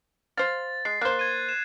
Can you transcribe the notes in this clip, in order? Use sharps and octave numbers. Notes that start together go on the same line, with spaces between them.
C5 F5 A6
G#3 C7
A#3 C5 F#6
G#6 D#7
E7